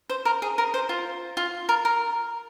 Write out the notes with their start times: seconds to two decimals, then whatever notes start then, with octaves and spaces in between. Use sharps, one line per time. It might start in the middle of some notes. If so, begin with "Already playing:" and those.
0.10 C5
0.25 A#4
0.42 G#4
0.58 A#4
0.74 C5
0.89 F4
1.37 F4
1.69 A#4
1.85 A#4